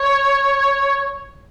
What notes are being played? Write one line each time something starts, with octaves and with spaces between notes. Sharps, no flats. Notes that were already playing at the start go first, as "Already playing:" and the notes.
Already playing: C#5